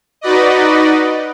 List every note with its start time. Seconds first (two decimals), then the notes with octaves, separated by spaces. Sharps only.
0.21 D#4 F#4 B4 D5 D#5